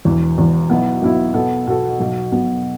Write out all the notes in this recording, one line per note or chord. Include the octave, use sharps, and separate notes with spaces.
E1 E2 E3
E1 E2 E3
B1 B2 B3 E4
B1 B2 B3 E4
B2 B3 F#4 A4
B2 B3 F#4 A4
B1 B2 B3
B1 B2 B3